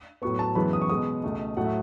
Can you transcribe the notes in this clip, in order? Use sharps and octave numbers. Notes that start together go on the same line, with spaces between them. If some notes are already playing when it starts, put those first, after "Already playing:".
A2 F#3 B3 C#6
A5
F#2 E3 G#3 B3 B5
D#6
C#6
B2 G#3 B3 D#6
C#2 B2 A3
A2 F#3 A3 F#5
E5